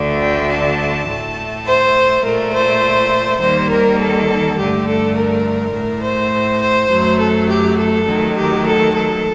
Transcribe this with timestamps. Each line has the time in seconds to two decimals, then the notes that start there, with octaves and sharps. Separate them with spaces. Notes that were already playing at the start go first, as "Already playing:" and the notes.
Already playing: D2 D3 A3
0.20 G5
0.49 A5
1.07 A2 A3
1.65 C5
2.23 A#2 A3 A#4
2.52 C5
3.40 D#2 D#3 G3 A#3 C5
3.69 A#4
3.98 A4
4.57 G2 D3 A3 G4
4.85 A4
5.15 A#4
5.73 A2 A3
6.02 C5
6.60 C5
6.89 F#2 F#3 A3
7.19 A4
7.48 G4
7.76 A4
8.06 D#2 D#3 F#3 A3
8.35 G4
8.65 A4
8.93 A4